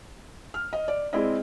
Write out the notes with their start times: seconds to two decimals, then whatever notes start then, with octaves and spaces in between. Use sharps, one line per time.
0.54 F6
0.73 D#5
0.88 D5
1.13 G#3 C4 E4 G#4 D5 D#5